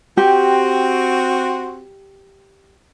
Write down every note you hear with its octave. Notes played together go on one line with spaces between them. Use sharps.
C4 F#4 G4